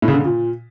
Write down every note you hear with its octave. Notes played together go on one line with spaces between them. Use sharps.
A2
C#3
D3
C#3
A#2